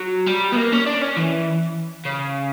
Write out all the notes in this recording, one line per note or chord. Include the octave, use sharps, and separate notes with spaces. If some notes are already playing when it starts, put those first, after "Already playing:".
Already playing: F#3
G3
B3
A#3
C#4
D4
C#4
E3
C#3